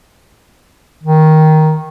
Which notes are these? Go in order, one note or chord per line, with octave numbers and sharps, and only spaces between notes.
D#3